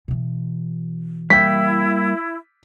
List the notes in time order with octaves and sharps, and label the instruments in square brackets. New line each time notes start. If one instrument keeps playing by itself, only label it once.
[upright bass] B2 E3
[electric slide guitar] G3 A#3 G5 [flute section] E4 [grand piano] B6